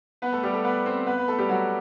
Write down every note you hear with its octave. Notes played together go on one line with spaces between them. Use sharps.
B3 B4
A3 A4
G3 G4
A3 A4
B3 B4
C4 C5
B3 B4
B3 B4
A3 A4
G3 G4
F#3 F#4